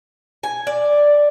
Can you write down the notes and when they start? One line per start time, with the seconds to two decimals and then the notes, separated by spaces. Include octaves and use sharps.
0.43 G#5
0.67 D5